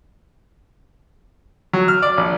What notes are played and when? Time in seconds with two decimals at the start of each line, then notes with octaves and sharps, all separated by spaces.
1.73 F#3
1.88 F6
2.02 D5
2.17 A#1